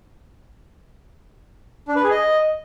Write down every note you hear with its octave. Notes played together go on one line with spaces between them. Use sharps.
D4
B4
G#4
D#5